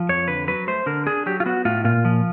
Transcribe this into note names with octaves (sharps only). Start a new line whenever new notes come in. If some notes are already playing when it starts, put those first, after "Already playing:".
Already playing: F3
F2 C#5
D3 B4
F#3 B4
A3 C5
D3 A#4
D4 G#4
F#3 G4
F4
B3 F#4
A2 F4
A#2 F4
F3